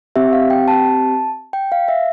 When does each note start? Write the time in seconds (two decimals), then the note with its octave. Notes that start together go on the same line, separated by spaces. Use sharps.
0.16 C4 G4 E5
0.33 F5
0.50 G5
0.68 A5
1.53 G5
1.72 F5
1.88 E5